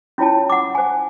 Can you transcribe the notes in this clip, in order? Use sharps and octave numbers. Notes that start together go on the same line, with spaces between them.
C#4 E4 F4 C#5 G5 A5
F#5 D6
C5 G#5